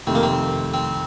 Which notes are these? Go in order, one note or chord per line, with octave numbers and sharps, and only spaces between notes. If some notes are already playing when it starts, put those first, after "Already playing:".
F2 C3 D#3 A3 C4
A#3
C4
C4